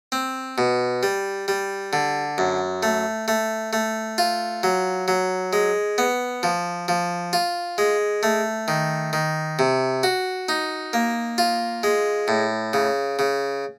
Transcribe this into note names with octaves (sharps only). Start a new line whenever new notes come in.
C4
B2
G3
G3
D3
F#2
A3
A3
A3
F4
F#3
F#3
G#3
B3
F3
F3
F4
G#3
A3
D#3
D#3
C3
F#4
D#4
A#3
F4
G#3
A2
C#3
C#3